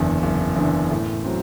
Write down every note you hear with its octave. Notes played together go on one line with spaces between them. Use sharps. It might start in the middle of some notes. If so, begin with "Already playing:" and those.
Already playing: F#1 E2 D3
F#1
E2 D3
A2
F#3 C4